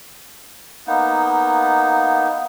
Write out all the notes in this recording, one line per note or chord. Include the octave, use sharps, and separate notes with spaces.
A#3 B3 D#4